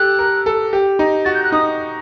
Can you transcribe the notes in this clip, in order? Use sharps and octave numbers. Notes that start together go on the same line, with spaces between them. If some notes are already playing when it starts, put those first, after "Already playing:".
Already playing: G4 A4 F#6
A#4
A4
G4
D#4
F#4 A6
G6
F#6
D#4 D#6